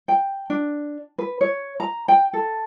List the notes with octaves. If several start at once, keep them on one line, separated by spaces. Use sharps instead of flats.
G5
D4
B4
C#5
A#5
G5
A4